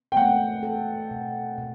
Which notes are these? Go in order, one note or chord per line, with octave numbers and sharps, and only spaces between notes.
G5
A3 F#5
A4
B2
B2